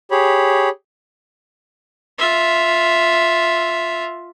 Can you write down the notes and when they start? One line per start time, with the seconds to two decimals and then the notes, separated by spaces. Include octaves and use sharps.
0.11 G4 G#4 C#5 B5
2.18 F4 E5